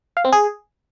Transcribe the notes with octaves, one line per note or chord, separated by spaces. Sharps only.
F5
C4
G#4